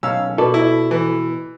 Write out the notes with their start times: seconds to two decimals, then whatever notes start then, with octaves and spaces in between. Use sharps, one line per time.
0.03 B1 C#4 F5 E6
0.38 B2 A4 B4 D5
0.54 E4
0.91 E3